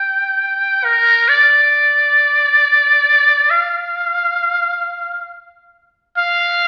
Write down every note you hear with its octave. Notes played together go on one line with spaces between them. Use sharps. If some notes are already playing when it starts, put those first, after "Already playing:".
Already playing: G5
A#4
D5
F5
F5